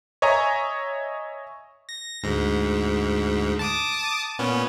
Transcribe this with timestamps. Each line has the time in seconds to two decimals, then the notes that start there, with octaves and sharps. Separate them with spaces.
0.22 C#5 D#5 E5 G#5 A#5 C#6
1.89 A#6
2.23 D2 G#2
3.59 A5 D6 D#6
4.39 A#2 B3 C#4